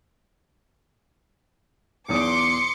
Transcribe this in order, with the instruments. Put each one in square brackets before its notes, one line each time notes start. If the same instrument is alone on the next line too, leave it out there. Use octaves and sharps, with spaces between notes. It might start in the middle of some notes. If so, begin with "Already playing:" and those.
[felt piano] B1 E2 D#6 [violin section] C6 D6 [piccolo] C#7